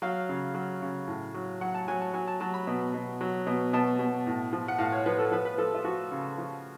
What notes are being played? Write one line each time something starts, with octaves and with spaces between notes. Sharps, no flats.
F#3 F5
C#3
F#3
C#3
A2
F#3
F#3 F#5
A5
F#3 G#5
A5
F#3 G#5
A5
F#3 A5
B5
B2
B2
F#3
B2
B2 A5
B2
A2
F3
F#5
A2 F5
C#5
F3 B4
A4
F3 B4
B4
F3 A4
F4
F3 F#4
C#3
F3